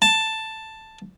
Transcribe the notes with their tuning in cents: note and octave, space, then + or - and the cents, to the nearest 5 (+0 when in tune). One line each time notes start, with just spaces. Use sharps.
A5 +5